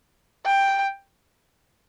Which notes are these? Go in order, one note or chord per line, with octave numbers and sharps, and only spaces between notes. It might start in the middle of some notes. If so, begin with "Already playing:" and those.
G5